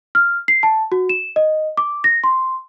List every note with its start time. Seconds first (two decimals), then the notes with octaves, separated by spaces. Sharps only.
0.15 F6
0.48 C7
0.63 A5
0.92 F#4
1.09 E7
1.36 D#5
1.77 D6
2.04 A#6
2.24 C6